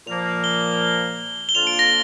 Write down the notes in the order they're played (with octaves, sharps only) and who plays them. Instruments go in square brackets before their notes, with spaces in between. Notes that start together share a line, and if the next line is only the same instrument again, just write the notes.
[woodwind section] A#2 F3 A#3 [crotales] F7
[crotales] G7
G7
[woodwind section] F2 D3 A#3 D4 F4 [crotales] F7
[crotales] D7
A#6